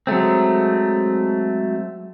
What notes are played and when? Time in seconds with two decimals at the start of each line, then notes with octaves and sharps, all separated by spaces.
0.07 F#3 G#3 A3 C4